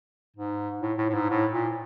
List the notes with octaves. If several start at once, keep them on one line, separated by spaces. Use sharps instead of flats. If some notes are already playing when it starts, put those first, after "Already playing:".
G#2
A2
A2
A2
G#2
A2
A#2